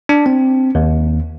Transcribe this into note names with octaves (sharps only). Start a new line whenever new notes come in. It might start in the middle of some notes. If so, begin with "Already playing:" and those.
D4
C4
D#2